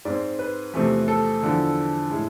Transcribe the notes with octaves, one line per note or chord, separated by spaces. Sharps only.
G#2 G#3 C4 D5
B4
E2 C3 F3 A3 C4
A4
E2 D3 F3
A2 G#3